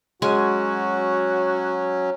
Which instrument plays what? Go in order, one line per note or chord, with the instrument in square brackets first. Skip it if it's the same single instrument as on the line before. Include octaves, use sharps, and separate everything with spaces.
[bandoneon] F#3 C#4 [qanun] G#3 G#5 [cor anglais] F#4